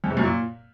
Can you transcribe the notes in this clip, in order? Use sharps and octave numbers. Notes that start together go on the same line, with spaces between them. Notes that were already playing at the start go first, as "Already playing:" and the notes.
F2
C3
F#2
A#2